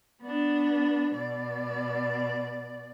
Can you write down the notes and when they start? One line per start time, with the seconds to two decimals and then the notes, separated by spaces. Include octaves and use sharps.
0.22 B3 D4
1.15 B2 D5